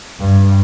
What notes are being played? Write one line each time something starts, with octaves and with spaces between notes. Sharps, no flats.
G2